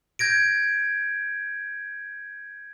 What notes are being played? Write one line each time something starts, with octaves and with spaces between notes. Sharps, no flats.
G6 G#6 A#6 D7